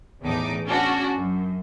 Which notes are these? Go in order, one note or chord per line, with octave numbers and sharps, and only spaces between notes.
E2 A2 D#4 D6
C#4 D4 F#4
F#2